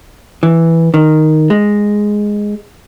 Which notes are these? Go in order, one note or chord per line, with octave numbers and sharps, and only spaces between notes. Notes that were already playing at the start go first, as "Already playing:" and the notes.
E3
D#3
G#3